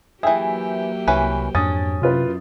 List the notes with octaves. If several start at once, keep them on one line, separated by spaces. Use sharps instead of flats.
E3 F#3 A#3 G4 G#4 E5 G5
C2 E3 C#4 B4
F2 G#2 C#4 D4 D#6 A6
F#2 C3 E4 F4 B4